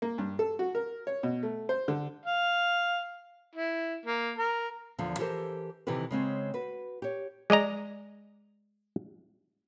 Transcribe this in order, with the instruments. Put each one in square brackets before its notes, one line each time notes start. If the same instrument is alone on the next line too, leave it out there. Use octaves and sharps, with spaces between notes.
[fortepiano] A#3
G2
A4
F#4
A#4
C#5
B2
A3
C5
D3
[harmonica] F5
E4
A#3
A#4
[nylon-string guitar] E2 D3 F3
E3 G4 A4 A#4 C5 A5
C3 D#3 E3 G4 A4 B4
C#3 G#3 C4 C#4
F#4 B4
G4 C#5
[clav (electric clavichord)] G#3 D5 D#5 A#5